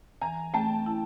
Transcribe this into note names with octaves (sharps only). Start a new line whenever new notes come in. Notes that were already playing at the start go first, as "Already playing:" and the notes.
E3 G#5 A#5
A3 G5 A5
E4